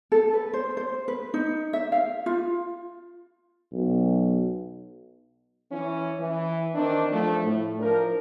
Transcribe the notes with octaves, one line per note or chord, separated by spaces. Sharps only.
A4
B4
C5
C5
B4
D#4
E5
F5
F4
B1
E3 C#4
E3
D#3 C4 D4
F3 A3
A2
F3 D4 A#4